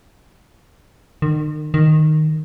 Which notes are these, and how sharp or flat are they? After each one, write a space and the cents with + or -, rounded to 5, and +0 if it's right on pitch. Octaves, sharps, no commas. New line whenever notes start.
D#3 -40
D#3 -10